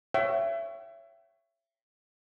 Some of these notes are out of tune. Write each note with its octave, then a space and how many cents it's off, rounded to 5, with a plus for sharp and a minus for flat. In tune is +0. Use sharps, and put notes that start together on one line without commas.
C#5 +0 E5 +30 G5 -45